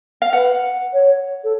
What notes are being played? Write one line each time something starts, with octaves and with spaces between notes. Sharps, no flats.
F5
B4 F#5
C#5
A4